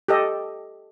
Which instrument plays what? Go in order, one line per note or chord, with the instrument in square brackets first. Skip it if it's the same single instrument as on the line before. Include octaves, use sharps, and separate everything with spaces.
[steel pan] G4 A4 D#5